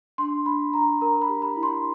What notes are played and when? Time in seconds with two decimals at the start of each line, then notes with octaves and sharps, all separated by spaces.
0.18 D4 C6
0.46 D4 B5
0.74 D4 A#5
1.01 A#4 A#5
1.22 B5
1.29 G4
1.42 B5
1.56 E4
1.63 C6